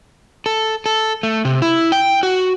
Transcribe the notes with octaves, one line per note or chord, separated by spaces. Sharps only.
A4
A4
A3
C3
E4
G5
F#4